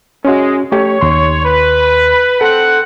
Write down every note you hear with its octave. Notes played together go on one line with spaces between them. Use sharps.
G#3 C#4 F#4
A3 G4 C#5
D#2 C6
B4
C4 A4 F#5